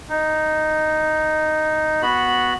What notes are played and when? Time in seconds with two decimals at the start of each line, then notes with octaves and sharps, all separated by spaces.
0.09 D#4
2.02 B3 F#4 B5